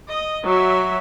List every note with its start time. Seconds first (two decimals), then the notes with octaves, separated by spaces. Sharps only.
0.10 D#5
0.45 F#3 E5